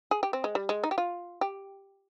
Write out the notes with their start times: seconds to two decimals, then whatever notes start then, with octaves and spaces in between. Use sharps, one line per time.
0.11 G#4
0.23 G4
0.33 C4
0.44 G#3
0.55 G3
0.69 G#3
0.84 D#4
0.91 G4
0.98 F4
1.41 G4